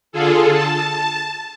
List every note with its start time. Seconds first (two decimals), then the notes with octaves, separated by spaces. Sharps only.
0.12 D3 F4 G#4 A4
0.52 A5